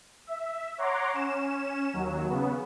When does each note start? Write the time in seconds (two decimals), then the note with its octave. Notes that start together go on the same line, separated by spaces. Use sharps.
0.27 E5
0.78 C#5 F#5 A#5 C6 D6
1.13 C#4 E7
1.94 D#2 F#3
2.29 C#3 B3